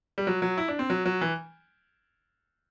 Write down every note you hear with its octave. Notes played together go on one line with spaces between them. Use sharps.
G3
F#3
F#3
E4
D4
C4
F#3
F#3
E3